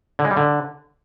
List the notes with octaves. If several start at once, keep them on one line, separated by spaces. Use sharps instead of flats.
D3
G#3
G3
D3